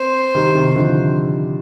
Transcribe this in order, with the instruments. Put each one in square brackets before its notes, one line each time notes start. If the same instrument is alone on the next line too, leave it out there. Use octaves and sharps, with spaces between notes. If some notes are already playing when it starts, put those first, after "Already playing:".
Already playing: [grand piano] C4 [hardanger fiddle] C5
[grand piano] D#3 G3
C3 D#3
D3 F3